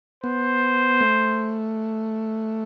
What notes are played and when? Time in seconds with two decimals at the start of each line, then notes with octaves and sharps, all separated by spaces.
0.24 B3 C5
1.01 A3